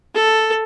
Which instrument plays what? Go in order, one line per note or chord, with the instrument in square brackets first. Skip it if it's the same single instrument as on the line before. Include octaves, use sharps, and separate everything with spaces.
[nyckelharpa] A4